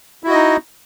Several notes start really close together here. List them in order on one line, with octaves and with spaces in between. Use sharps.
E4 F#4 D#5 D#4